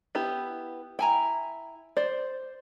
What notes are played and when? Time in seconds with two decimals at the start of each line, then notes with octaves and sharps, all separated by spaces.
0.15 B3 E4 G4
0.99 E4 G5 G#5 A#5
1.97 C5 D5